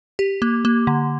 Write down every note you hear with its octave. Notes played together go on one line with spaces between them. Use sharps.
G4
A#3
A#3
D3